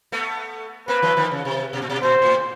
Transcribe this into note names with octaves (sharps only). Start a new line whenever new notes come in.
A3 B3
A#3 C4 B4
E3 F#3
D#3 F3
C#3
C3
B2
A#2
B2
A#2 C5
A2